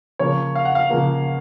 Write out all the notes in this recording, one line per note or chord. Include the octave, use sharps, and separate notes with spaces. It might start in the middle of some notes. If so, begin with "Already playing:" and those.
C#3 F3 A#3 C#5
F5
F#5
F5
C#3 F3 A#3